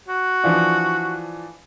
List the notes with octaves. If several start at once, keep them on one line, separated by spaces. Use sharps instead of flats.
F#4
E3 F3 D4